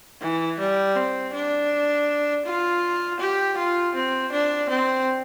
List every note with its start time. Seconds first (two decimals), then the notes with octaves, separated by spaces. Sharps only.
0.21 E3
0.59 G3
0.96 C4
1.33 D4
2.45 F4
3.20 G4
3.57 F4
3.95 C4
4.32 D4
4.69 C4